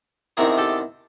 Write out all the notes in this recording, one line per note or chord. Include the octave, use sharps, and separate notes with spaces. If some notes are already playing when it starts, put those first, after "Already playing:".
E2 C3 D#3 G#4 A#4
G4 A4